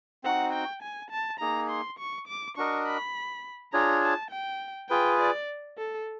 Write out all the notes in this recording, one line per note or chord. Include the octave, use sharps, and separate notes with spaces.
C4 D#4 F#4 F#5
G5
G#5
A5
A#3 D#4 G#4 A#5
C6
C#6
D6
D4 F#4 A#4 D#5 C#6
B5
D4 F4 G#4 C#5 A#5
A5
G5
F4 G#4 B4 G5
D5
A4